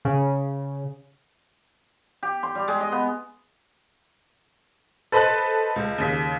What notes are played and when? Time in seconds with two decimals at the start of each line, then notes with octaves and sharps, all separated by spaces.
0.05 C#3
2.23 G4
2.43 C6
2.55 G3
2.68 G#3
2.80 D#5
2.92 B3
5.12 A4 B4 C5 D#5 A5 F#6
5.76 C#2
5.98 D#2 C#3 B6